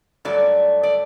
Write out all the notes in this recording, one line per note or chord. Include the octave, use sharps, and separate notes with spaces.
G2 F#3 A3 D5
D5